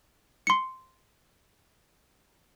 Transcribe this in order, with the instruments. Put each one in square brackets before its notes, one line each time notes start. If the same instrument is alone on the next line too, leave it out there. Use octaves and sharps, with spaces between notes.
[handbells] C6 C#7